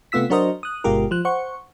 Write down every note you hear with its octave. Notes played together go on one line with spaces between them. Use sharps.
C3 A3 B3 F4 E6 B6
F#3 D4 F#4 A#4 C5 D#5
D#6 F#6
G1 B2 G#3 F4 G4 A#4
F3 F#6
C5 F#5 C#6